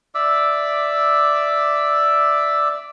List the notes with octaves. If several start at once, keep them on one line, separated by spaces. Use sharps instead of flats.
D5 E5 D6 E6